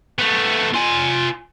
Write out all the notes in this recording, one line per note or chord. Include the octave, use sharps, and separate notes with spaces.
A3 B3
F4 G#5